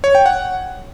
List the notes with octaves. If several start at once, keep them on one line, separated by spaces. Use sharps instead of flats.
C#5
G5
F#5